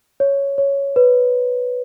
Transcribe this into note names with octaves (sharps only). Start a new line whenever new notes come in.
C#5
C#5
B4